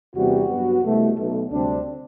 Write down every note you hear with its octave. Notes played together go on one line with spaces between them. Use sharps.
E2 C3 G3 B3 F#4
G2 F#3 B3
C2 B2 A3
B1 B2 A3
D2 C3 G3 C4 D4